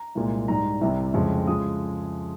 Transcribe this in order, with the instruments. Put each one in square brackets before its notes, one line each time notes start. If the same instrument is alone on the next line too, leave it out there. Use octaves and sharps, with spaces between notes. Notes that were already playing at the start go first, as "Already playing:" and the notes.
Already playing: [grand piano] A#5
C2 A#2 G#3
G#2 G3 A#5
C2 C3 G3
F2 C#3 F3 G#3
C#3 F3 G#3 D#6